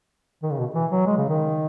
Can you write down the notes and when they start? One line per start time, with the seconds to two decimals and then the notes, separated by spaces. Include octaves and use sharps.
0.43 D#3
0.51 C#3
0.59 B2
0.74 E3
0.91 F#3
1.06 G#3
1.18 C#3
1.29 D#3